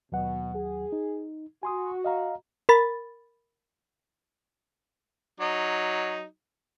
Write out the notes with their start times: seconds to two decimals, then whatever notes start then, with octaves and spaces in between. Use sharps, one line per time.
0.12 D#2 B2 F#3 F#5
0.55 G#4
0.92 D#4
1.63 F#4 G#5 C6 D#6
2.04 D#5 F5 A#5
2.69 A#4 B5 A6
5.40 F#3 D#4